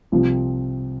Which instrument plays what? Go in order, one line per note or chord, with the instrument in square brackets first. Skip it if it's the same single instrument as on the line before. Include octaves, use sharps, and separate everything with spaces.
[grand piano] C2 C3 F3 C4